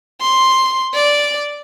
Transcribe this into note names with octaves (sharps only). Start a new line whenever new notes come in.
C6
D5